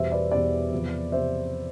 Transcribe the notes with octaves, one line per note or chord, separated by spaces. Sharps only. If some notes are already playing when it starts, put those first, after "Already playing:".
Already playing: E2 B2 G3 C5 E5
B4 D5
E2 B2 G3 B4 D5
E2 C3 F3
C3 C5 E5